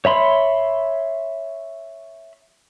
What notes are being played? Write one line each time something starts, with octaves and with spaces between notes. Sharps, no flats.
C#5 E5 B5 C6